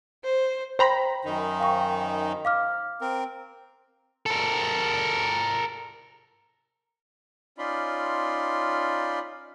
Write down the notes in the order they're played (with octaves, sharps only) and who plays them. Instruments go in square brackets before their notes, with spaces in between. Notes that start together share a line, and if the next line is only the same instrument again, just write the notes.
[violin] C5
[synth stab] C5 A#5 B5 [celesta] G5
[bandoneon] F#2 D#3 D#4
[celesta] F5 G5 C#6
F5 D6 F6
[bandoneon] C4 A#4
[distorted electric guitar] A4 A#4
[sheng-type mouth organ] C#4 D#4 F4 D5 B5 C6